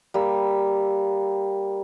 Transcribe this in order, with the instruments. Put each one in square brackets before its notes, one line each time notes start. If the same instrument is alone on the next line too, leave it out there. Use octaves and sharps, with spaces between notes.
[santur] G3 A#3 E6